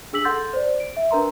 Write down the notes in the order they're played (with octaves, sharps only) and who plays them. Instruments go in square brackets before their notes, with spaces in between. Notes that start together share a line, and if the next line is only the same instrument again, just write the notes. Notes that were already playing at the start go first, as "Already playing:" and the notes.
[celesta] D4 G#4 E6 B6 F#7
A4 F#5 C6 G6 A6 A#6
C5 D5
D7
E5
D4 A#4 B4 A#5 C6